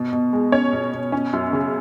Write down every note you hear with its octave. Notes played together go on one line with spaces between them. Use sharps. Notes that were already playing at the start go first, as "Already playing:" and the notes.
Already playing: B2
B2
G#3
C#4 C#5
B2
B2
C#4
F#2
C#3